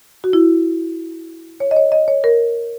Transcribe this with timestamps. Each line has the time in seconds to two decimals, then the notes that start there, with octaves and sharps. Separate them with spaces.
0.24 F#4
0.33 E4
1.60 C#5
1.71 D#5
1.76 C#5
1.92 D#5
2.08 C#5
2.24 A#4